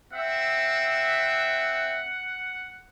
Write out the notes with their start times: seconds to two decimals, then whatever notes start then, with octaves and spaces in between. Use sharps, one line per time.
0.12 C4 E5 F#5